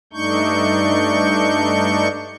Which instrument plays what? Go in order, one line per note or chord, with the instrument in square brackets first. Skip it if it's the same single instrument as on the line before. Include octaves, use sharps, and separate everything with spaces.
[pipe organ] G2 A3 D4 D#4 C#6 G6